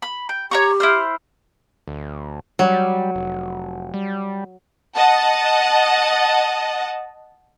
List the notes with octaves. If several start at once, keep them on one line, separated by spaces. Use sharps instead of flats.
B5
G5
G4 C#5 A#5 C#6
E4 C5 F6
D2
F#3 G3
F1
G3
D#5 F#5 A5